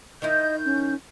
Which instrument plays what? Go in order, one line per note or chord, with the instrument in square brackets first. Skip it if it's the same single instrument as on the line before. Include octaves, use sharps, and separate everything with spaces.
[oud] D#3 D#4 E4 [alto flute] D#5 [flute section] G6
[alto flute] C#4